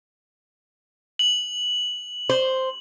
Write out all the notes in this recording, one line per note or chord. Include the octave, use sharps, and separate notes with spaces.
F#7
C5